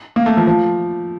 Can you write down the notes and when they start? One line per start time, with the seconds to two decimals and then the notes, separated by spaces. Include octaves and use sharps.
0.16 A#3
0.26 A3
0.37 F3
0.47 F3